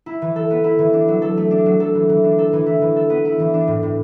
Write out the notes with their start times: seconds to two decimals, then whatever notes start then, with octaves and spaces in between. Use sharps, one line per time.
0.06 E4
0.22 E3
0.36 A4
0.50 B3
0.64 E4
0.79 E3
0.93 D4
1.08 F#3
1.22 A4
1.37 A3
1.51 D4
1.66 F#3
1.80 A4
1.95 E3
2.09 E3
2.24 D4
2.39 A4
2.53 E3
2.66 E4
2.81 E3
2.96 A4
3.10 B3
3.25 E4
3.39 E3
3.54 D4
3.68 A2
3.83 A2